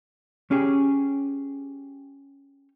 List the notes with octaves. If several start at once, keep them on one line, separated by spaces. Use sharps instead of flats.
C#4 G4 G#4